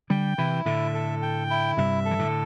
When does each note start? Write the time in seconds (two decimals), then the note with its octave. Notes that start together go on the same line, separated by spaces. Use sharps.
0.10 D3 G3 G5
0.38 C3 E3 E4
0.66 A2 D3 E5
0.94 A4
1.22 G5
1.50 E4
1.77 G2 C3 E5
2.05 A4
2.11 E3
2.19 A2 D3